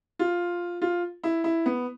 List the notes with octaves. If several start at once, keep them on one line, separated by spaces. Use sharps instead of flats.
F4
F4
E4
E4
B3